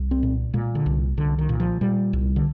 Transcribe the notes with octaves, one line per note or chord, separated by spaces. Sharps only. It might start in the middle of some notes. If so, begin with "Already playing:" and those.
Already playing: C2
C4
A#2
A#2 G#3
D3
C2
C2 D3
D#3
A#2
F3
A#2 G3
C2
D3